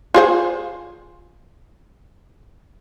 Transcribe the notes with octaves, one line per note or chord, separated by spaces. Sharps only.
F4 G#4 C5